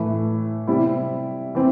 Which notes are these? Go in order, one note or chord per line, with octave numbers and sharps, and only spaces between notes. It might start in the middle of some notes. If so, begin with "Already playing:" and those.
Already playing: A2 E3 A3 E4
C3 G3 C4 E4
E3 C4